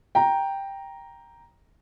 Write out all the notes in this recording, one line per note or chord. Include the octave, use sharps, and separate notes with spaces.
G5 A#5